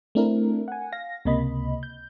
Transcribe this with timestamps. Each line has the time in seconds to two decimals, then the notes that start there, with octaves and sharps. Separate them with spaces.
0.15 A3 C4 D4 E4 A#4
0.68 F#5 G#5
0.93 F5 A#6
1.25 C#2 C3 A#3 D#5 B5
1.83 G6